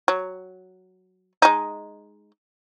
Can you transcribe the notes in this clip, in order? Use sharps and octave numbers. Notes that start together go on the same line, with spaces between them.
F#3
G#3 D#4